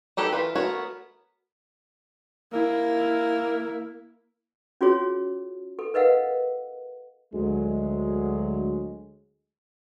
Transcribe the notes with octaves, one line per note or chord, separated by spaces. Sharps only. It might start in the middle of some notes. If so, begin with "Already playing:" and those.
D#4 G4 A4 B4 C#5
E3 F4 B4
A3 B3 F#4 A#4 C#5
A#3 E4
C#4 F4 F#4 G#4 C#5
A4
A#4 B4 D#5 F5 F#5
D2 F#3 G#3